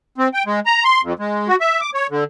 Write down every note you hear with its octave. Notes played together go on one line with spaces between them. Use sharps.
C4
G5
G#3
A#5
C6
F2
G#3
F#4
E5
D6
C#5
D3